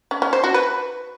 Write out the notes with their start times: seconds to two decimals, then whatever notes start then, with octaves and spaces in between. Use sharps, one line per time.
0.11 C#4
0.22 C#4
0.33 C5
0.44 F#4
0.54 B4